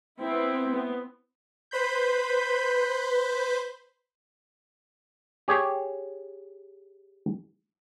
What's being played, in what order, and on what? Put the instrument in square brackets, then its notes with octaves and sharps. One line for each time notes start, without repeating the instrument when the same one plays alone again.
[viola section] B3 C4 E4
B3 C4
[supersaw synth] B4 C5 B5 G6
[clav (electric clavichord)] G4 G#4 C#5